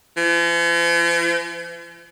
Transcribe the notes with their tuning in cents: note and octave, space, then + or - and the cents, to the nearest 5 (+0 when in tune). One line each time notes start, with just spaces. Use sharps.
F3 -45